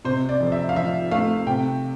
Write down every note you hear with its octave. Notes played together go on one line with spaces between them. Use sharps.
C3 C5
D5
F2
E5
F5
F3 E5
A3 F5
C3 G5